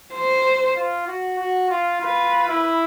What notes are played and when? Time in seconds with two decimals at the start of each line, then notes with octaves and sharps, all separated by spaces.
0.13 C5
0.76 F4
1.08 F#4
1.39 F#4
1.70 F4
2.01 F4 B4
2.48 E4